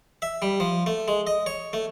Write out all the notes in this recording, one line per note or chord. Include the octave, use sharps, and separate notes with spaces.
E5
G3
F3
A3
G#3
D#5
C#5
A3